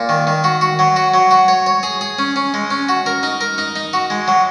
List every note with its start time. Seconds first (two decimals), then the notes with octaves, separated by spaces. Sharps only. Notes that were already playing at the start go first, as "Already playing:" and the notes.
Already playing: A#2
0.09 D#3
0.27 D#3
0.44 F#4
0.61 F#4
0.79 F#3
0.96 F#4
1.14 F#3
1.31 F#4
1.48 C#5
1.66 C#5
1.83 G#4
2.01 G#4
2.19 C#4
2.36 C#4
2.54 G#3
2.71 C#4
2.89 F#4
3.06 A#4
3.23 D#4
3.41 A#4
3.58 D#4
3.76 D#4
3.93 F#4
4.10 G#3
4.28 F#3